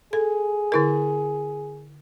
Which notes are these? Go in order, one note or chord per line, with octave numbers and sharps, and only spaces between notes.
G#4 A4
D3 E4 A#4